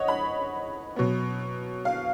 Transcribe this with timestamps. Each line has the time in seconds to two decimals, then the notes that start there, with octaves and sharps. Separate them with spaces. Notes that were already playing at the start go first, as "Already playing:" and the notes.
Already playing: C#5 D#5 F#5
0.08 B5
0.96 B2 F#3 B3
1.85 F5